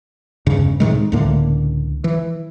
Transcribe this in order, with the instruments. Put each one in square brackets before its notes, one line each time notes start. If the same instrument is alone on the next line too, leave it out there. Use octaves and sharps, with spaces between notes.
[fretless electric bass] E1 G2 C#3
A2 C3 D#3 G#3
C#2 A2 D3 A#3
E3